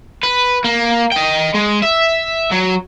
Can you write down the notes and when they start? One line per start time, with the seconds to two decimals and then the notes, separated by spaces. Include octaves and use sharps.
0.23 B4
0.64 A#3
1.12 D#5 G5
1.54 G#3
1.83 E5
2.51 F#3